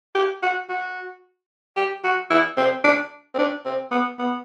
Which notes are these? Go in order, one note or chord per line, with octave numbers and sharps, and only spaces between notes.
G4
F#4
F#4
G4
F#4
E4
C4
D4
C4
D4
C4
B3
B3